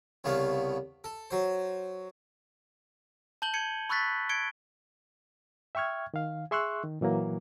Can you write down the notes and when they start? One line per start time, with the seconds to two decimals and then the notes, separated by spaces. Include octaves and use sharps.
0.24 C2 C#3 A3 B3 F5
1.04 A4
1.31 F#3 C5
3.42 A5 G6 F#7 G7
3.54 G#6 C#7 D#7
3.89 B5 C#6 E6 F#6 A6 B6
4.29 G#6 C#7 D7 G7
5.75 E5 G5 C#6 F6 G#6
6.14 D#3 F5
6.51 G#4 E5 C6 C#6 E6 F#6
6.84 D#3
7.01 A#2 E3 F#3 A#3